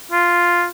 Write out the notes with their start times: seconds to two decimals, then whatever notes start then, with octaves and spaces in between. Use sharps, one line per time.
0.12 F4